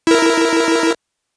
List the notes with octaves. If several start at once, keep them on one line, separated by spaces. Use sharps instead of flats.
E4 A#4